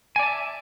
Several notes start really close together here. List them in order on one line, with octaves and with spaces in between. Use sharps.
G#5 D5 A5 E5